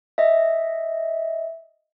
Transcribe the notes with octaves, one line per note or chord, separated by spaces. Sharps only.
D#5 E5